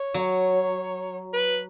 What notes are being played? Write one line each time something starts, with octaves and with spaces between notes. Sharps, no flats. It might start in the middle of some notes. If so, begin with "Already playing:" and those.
Already playing: C#5
F#3
B4